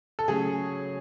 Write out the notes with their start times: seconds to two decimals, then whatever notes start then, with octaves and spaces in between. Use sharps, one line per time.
0.19 A4
0.28 C#3 F#3 A3 G#4